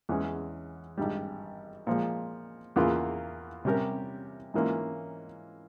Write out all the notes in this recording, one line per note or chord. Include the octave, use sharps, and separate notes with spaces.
E2 E3 G#3 C#4
G#1 G2 G3
A#2 F3 G#3
E2 C#3 E3 A#3 F4
C3 G3 C#4 G4 A#4
G#2 E3 A#3 C#4 F4